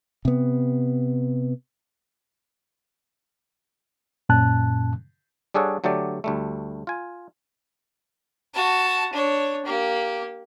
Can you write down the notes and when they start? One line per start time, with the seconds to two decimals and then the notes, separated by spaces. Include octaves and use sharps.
0.25 C3 B3
4.29 F#2 A#2 C#4 A5 F#6
5.54 G3 D4 G#4 A4 C#5 F#5
5.84 D3 F#3 A3 G4 D5
6.24 D2 G3 A3
6.87 F4 G#5
8.54 F#4 A5
9.13 D4 C#5
9.65 A#3 G4